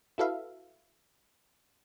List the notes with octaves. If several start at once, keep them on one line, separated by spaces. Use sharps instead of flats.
E4 F#4 A4 B4 E5 F5